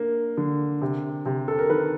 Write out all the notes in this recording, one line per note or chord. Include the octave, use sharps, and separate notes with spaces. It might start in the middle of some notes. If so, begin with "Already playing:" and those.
Already playing: A#3 D4
D3
C3
C3
A4
A#4
D#3 B4